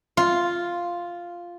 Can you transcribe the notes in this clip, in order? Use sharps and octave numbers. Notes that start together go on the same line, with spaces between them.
F4